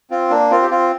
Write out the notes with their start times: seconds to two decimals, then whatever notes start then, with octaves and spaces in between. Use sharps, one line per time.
0.11 C4 F4
0.30 A#3 D4
0.51 C4 F4
0.62 G4
0.71 C4 F4